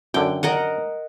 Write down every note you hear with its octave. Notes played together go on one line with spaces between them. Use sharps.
F#2 D3 G5
A#4 D#5 F#5